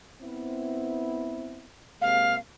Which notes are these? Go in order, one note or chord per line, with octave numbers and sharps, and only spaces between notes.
B3 C4 E4
C3 G#3 A#3 F5